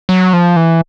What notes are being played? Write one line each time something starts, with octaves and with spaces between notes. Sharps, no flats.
F#3
F3
E3